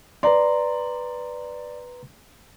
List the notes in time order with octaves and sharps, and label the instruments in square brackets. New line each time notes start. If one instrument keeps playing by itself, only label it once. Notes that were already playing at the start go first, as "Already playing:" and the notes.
[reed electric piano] B4 A#5 C6 [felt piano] D5